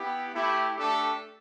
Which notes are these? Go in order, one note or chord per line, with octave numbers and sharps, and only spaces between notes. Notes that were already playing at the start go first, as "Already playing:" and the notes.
Already playing: B3 E4 G4
A3 E4 G4
A3 D4 G4 A4